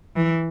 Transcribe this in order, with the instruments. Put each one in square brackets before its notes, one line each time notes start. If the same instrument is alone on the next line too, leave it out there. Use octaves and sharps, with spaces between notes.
[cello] E3